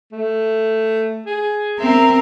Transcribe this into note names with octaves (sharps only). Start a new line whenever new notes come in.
A3
G#4
C4 A#4 E5